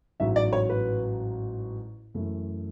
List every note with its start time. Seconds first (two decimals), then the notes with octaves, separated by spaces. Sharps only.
0.20 A1 G#2 F#3 E5
0.36 D5
0.53 C#5
0.69 B4
2.15 F#2 E3 A3